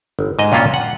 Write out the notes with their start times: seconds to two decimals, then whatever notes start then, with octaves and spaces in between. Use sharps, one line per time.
0.19 G1
0.39 G#2 D#5
0.52 G2 A#2 C#4 F4 F#4
0.74 F#5